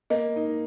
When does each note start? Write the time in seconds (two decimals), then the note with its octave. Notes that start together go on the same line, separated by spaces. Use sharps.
0.10 A#3 D#5
0.36 D#4